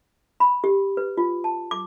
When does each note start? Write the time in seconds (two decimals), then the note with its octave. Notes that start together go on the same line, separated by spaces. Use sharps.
0.40 B5
0.64 G4
0.97 B4
1.17 F4
1.44 A5
1.71 D6